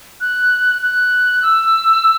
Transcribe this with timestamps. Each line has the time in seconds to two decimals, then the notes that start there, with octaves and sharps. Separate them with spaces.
0.21 F#6
0.81 F#6
1.42 E6